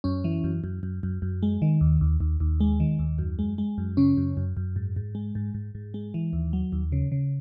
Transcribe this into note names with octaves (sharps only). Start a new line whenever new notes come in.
F#2 C#4
E3
F#2
F#2
F#2
F#2
F#2
G#3
D#3
D#2
D#2
D#2
D#2
G#3
D#3
D#2
F#2
G#3
G#3
F#2
C#3 C#4
F#2
F#2
F#2
G#2
G#2
G#3
G#2
G#2
G#2
G#3
E3
D#2
F#3
D#2
C#3
C#3